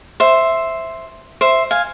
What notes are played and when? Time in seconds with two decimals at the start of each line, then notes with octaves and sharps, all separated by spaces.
0.20 C5 E5
1.41 C5 E5
1.71 F5 G#5